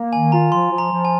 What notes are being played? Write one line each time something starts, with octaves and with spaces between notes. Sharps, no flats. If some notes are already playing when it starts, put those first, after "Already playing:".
Already playing: A#3
D#3 G#5
F4 A#5
F3 C6
F3
A#5
F3
G#5